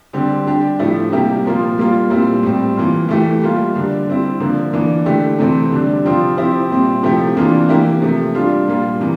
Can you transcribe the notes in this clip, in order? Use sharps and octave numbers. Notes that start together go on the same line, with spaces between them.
D3 G3 C4 G4
G3 D4 G4
A2 F3 A3 E4 G4
C3 G3 A#3 E4 G4
A#2 F3 A#3 F4
G3 A#3 F4
A#2 G3 C4 E4
A2 G3 C4
E3 A#3 F4
E3 A3 E4 G4
G3 A#3 F4
D3 G3 D4
G3 C4 E4
D3 F3 A#3
E3 A#3 D4
D3 A3 E4 G4
C3 E3 A3 C4
D3 G3 D4
C3 F3 C4 F4
F3 C4 E4 G4
A#2 G3 C4
C3 F3 A3 E4 G4
C3 E3 A#3 D4 F4
E3 A#3 E4 G4
C3 F3 A3
G3 D4 F4
A#2 G3 A#3 F4
C3 E3